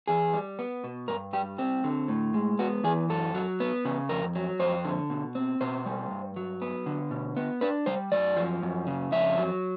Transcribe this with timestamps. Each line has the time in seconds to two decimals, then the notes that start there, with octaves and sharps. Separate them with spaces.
0.08 E2 G#4
0.34 G3
0.59 B3
0.84 B2
1.08 G2 A#4
1.33 G3 G4
1.58 C4 G4
1.84 D3
2.08 A2
2.34 G#3
2.59 B3 F#4
2.84 E3 G#4
3.10 F#2 A4
3.35 F#3
3.60 B3
3.85 C#3
4.09 F2 A#4
4.35 F#3
4.59 F2 C5
4.85 D3
5.10 B2
5.35 C4
5.61 B2 C5
5.86 G3
6.11 G2
6.36 F#3
6.62 B3
6.86 D3
7.11 B2
7.37 B3
7.61 D4 B4
7.86 G3 C5
8.12 F#2 D5
8.36 F3
8.63 F#2
8.87 C#3
9.12 F2 E5
9.38 F#3